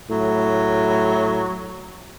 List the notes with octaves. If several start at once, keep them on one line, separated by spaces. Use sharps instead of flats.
A2 F#3